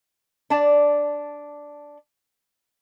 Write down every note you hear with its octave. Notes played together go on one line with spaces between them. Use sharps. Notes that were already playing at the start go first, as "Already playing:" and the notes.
D4 D5 A5